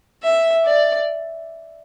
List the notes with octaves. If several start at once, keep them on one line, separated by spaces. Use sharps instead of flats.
E5
D5